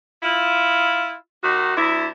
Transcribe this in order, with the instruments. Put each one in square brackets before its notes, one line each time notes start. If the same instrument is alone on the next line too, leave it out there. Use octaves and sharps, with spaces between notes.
[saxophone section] E4 F4
D#2 D#3 F#4
D2 E4